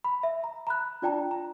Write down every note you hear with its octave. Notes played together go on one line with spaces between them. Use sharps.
B5
E5
A#5
A#5 B5 F#6
D4 F4 D5 G5 A5 A#5
A#5